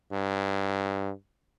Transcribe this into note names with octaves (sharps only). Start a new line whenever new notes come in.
G2